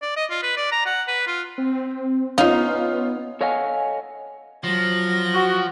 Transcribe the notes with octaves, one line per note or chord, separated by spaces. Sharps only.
D5
D#5
F4
B4
D5
A#5
F#5
B4
F4
C4
B3 C#4 D#4 F4 E5 F5
A4 C#5 D#5 F5 F#5 G#5
F3 F#3 A#6
F#4